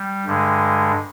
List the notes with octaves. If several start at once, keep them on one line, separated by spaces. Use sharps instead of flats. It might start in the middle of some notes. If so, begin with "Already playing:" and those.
Already playing: G3
G2 D3 G#3